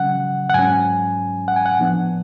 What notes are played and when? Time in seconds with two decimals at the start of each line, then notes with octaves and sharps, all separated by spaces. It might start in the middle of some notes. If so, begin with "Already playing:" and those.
Already playing: C#3 F#3 C#4 F#5
0.50 F#5
0.54 G#2 F#3 C#4 G#5
1.48 F#5
1.56 G#5
1.66 F#5
1.79 A2 F3 B3 D4